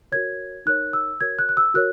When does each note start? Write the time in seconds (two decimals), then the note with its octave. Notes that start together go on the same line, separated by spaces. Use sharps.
0.12 F#4 A#4 C#5 G#6
0.66 D#4 A#4 C#5 F#6
0.93 E6
1.21 F#4 A#4 C#5 G#6
1.39 F#6
1.49 F#6
1.57 E6
1.74 F#4 A#4 C#5 F#6